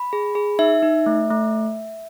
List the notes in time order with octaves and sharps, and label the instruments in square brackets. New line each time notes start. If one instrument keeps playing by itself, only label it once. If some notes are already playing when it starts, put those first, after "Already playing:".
Already playing: [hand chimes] B5
G#4
G#4
D#4 E5
D#4
A3
A3